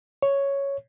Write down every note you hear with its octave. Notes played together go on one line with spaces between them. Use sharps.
C#5